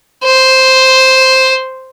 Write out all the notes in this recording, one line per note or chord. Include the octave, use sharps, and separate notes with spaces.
C5